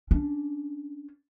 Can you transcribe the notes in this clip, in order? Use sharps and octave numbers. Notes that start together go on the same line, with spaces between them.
C#4 D4